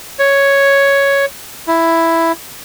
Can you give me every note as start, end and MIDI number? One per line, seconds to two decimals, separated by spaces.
0.19 1.25 73
1.68 2.32 64